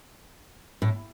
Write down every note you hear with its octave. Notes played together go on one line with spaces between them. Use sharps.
A2